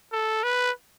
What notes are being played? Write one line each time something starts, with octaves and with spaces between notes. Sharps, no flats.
A4
B4